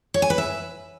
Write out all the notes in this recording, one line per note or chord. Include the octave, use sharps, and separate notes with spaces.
C#5
G#5
B4
E5